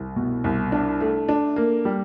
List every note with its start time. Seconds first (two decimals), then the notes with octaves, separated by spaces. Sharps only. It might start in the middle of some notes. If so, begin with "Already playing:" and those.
Already playing: C2
0.16 B2
0.44 C2
0.72 D4
1.01 A3
1.29 D4
1.56 A#3
1.85 G3